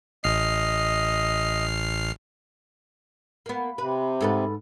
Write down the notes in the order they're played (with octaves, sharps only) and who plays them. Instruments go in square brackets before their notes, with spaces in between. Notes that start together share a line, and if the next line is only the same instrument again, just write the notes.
[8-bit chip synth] A1 F6 C7 [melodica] D#5
[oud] A#3 B3
[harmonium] C3 [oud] B4
[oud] G#2 A4 B4